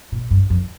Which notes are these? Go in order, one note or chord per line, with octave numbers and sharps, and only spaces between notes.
A#2
G2
F2